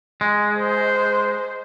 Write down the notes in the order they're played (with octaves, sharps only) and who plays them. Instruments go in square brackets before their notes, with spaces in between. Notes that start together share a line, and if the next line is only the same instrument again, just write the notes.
[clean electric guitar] G#3
[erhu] C5